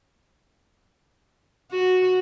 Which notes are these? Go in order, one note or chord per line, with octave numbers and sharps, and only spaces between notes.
F#4